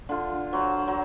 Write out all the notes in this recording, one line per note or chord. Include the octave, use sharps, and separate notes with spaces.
D3 F4
F#3 C5
F#3